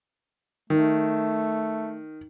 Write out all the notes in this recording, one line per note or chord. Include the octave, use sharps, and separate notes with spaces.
D#3 A3